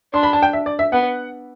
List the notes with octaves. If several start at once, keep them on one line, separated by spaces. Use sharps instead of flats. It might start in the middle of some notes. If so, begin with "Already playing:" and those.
D4 C6
B5
A5
G5
E5
D5
E5
B3 F#5